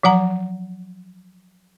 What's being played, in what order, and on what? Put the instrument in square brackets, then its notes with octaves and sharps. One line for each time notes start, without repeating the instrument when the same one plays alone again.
[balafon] F3 F#3 F#5 A#5